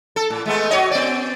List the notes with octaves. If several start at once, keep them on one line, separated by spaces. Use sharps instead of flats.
A4
A2
G#3 A3 B3
F#4 C#5 D#5
B3 D5